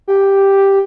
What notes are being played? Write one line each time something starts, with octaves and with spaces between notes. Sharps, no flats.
G4